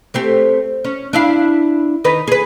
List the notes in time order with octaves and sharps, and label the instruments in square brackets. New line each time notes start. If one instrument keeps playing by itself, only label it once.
[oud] A3 C4 G4
C#4
D4 E4 F5
D#3 D#4 B4
G#4 B4